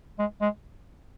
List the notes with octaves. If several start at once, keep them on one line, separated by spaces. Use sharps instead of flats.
G#3
G#3